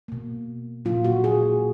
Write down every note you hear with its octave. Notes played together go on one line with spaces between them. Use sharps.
B2 A#3
A#2 F#3 A#3 F4
F#4
G#4